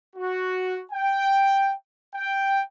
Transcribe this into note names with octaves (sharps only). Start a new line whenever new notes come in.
F#4
G5
G5